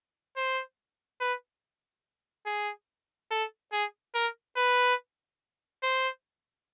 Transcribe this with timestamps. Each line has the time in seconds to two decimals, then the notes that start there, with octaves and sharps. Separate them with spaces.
0.36 C5
1.20 B4
2.46 G#4
3.31 A4
3.72 G#4
4.14 A#4
4.56 B4
5.83 C5